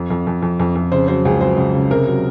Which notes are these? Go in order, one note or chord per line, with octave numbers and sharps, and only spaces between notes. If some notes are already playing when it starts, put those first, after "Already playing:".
Already playing: F2
F2
F2
F2
F2
F2
C#3 C5
F#3 C5
C#2 G#4
F#3 C5
C#2
C#3
C3 A#4
F#3